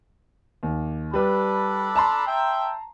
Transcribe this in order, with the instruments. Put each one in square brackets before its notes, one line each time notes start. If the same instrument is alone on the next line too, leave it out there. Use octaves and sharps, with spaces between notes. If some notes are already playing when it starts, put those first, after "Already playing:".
[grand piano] D#2
[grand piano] G3 B4 [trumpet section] D4 A4 B5
[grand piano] A5 A#5 C6
[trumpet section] E5 G5